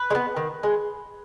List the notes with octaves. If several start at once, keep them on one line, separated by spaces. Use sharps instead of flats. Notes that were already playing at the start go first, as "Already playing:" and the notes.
Already playing: B4
G#3
B3
D#3
G#3